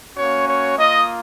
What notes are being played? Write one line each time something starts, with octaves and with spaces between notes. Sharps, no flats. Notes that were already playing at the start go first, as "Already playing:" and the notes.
A#3 C#4 F#4 C#5
C#5
A#3 F4 D#5